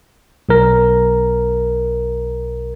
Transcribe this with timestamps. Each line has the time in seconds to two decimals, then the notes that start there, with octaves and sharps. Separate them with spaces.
0.49 B1 A#4